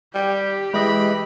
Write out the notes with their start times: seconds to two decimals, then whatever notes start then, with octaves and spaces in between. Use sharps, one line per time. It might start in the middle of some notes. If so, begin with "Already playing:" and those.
0.15 G3 G4
0.74 E3 G#3 D#5 B5